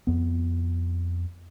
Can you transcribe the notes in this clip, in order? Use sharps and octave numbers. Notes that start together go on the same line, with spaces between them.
F2 B3